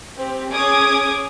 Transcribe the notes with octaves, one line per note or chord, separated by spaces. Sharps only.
C4 G4
C#4 G#4 C#5 D6 D#6 G#6